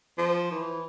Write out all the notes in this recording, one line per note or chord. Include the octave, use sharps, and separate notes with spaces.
F3
E3